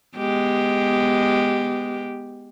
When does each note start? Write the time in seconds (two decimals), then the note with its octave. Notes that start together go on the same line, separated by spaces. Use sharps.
0.17 G#3 B3 G4